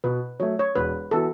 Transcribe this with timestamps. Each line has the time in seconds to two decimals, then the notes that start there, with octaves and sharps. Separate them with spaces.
0.04 B2 B4
0.39 F#3 A3 C#5
0.59 C#5
0.75 E1 B4
1.11 E3 B3 F#4 A4